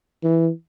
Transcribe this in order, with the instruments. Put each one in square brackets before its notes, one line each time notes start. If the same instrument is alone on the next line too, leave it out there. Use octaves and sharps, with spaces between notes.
[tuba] E3